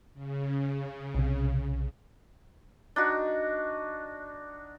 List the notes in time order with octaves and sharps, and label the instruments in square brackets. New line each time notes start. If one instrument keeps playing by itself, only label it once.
[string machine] C#3
[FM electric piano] B1 C3
[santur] D4 D#4 F#4